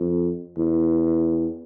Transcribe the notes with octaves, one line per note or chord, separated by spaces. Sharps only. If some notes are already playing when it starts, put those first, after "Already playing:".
Already playing: F2
E2